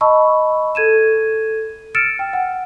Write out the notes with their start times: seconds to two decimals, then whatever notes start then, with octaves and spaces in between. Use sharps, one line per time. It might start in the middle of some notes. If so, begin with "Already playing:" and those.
0.01 D#5 A5 B5 C#6 E6
0.75 A4 G#6 D#7 E7
1.95 E6 F6 A6 C#7 D7 E7
2.19 G5
2.33 F#5